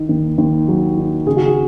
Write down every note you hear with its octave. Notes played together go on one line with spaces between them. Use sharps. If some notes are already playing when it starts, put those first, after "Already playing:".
Already playing: D#3
D#2
D#2
F#3
D#3
C#3 G#4
F#4
G#4